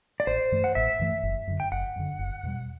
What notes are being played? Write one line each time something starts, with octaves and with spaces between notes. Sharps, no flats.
D5
A1 C5
G2 E3 A3
F#5
A1 E5
G2 E3 A3
F#1
F#2 D3
G5
F#1 F#5
F#2 D3
F#1
E2 B2 G3